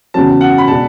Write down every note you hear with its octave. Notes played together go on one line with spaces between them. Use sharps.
E2 C#3 F#3 A5
F#5
B5
B2 G#3 D4 A5